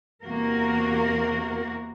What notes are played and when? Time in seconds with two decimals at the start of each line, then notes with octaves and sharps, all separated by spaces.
0.24 E2 C3 A#3 F#4 A#4